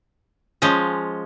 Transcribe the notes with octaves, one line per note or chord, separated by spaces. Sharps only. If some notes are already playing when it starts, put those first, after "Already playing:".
F3 G#3 C#4